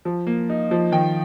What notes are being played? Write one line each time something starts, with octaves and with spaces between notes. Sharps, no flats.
F3
A#3
D#4
F3
D#3 G5